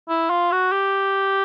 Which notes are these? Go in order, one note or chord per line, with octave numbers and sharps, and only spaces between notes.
E4
F4
F#4
G4